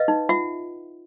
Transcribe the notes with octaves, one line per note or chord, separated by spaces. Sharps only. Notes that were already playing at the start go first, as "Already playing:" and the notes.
Already playing: B4 D#5 F5
D#4
F4 E5 F#5